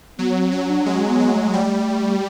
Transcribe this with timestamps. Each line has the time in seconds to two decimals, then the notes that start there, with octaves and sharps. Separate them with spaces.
0.18 F#3 B3
0.36 C4
0.52 F#3 C#4
0.69 D4
0.86 G#3 C#4
1.08 B3
1.20 F#3
1.31 A3
1.53 G3 A3